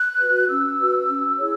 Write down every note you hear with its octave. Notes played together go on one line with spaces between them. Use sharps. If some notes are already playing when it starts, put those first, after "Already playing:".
Already playing: F#6
F#4 B4
C#4 E6
F#4 B4
C#4
E4 G#4 C#5